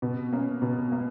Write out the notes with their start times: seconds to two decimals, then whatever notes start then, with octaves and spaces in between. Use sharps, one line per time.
0.02 B2
0.33 A#3 C#4
0.62 B2
0.92 A#3